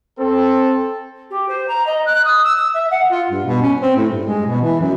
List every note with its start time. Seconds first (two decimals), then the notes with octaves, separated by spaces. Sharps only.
0.19 C4 A4
1.30 G4
1.48 C5
1.68 A#5
1.86 D#5
2.06 F#6
2.25 D#6
2.44 E6
2.56 E6
2.74 E5
2.91 F#5
3.10 F4
3.30 G2
3.46 B2
3.62 C#4
3.81 C4
3.96 A2
4.10 G2
4.26 G#3
4.45 B2
4.62 E3
4.80 F#2